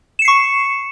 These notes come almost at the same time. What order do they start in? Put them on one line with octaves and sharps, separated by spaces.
E7 C#7 C7 C#6